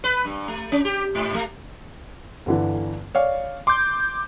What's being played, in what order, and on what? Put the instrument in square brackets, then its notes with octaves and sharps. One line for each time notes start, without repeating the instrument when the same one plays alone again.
[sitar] B4
G2
A3
C#4
G4
G#2
A3
[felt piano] G1 D3 E3
C#5 D5 F5
[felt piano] C6 [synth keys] D6 G6